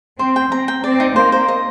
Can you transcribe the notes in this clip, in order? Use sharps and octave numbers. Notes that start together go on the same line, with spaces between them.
C4 C5
G5
C4 A#5
G5
C4 D5
D#4
A#3 C5
C5
D#5